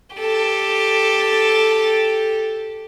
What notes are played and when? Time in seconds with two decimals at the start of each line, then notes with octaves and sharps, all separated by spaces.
0.16 G4 A4